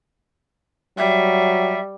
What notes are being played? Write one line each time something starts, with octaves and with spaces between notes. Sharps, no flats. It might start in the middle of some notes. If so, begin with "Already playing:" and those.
F#3 G3 E5